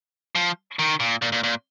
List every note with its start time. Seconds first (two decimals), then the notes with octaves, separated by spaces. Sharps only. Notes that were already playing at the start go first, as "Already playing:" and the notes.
0.35 F3
0.79 D#3
1.00 A#2
1.22 A#2
1.32 A#2
1.44 A#2